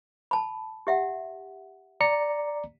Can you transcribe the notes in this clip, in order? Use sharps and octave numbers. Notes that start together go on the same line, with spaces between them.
A5 B5
G4 E5 F#5
D5 A#5 C#7